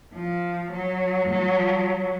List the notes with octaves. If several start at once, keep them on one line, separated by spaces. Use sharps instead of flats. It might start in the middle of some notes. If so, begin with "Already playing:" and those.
F3
F#3
F#3